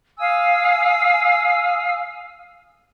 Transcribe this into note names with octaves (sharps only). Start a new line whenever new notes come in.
F5 G#5 D#6 E6